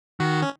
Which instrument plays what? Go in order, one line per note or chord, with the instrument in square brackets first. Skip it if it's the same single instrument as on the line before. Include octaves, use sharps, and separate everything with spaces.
[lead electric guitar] D#3 [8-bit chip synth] F#4
[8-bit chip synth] C#4